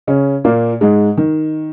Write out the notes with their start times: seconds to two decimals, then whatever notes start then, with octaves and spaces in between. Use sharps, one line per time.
0.07 C#3 C#4
0.45 A#2 A#3
0.81 G#2 G#3
1.17 D#3